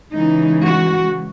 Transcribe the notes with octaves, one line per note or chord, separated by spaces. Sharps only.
C#3 E3 G#3 D#4
F#4